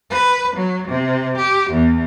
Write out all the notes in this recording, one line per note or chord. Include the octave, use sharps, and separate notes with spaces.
B4
F#3
C3
G4
E2